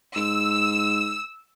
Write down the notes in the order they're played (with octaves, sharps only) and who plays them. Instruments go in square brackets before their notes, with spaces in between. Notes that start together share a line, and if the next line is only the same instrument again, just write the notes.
[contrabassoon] G#2 [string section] E6